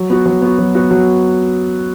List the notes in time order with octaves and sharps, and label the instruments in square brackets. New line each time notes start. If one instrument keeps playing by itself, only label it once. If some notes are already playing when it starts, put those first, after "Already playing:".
Already playing: [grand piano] F#3
B3 F#4
F#3
B3 F#4
F#3
B3 F#4
F#3